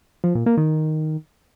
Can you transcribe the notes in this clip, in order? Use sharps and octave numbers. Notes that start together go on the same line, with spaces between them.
F3
A#2
A#3
D#3